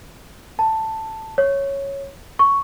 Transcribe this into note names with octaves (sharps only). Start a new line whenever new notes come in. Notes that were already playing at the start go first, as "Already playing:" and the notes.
A5
C#5
C#6